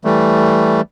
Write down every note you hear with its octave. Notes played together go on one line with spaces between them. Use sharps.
E3 G3 A3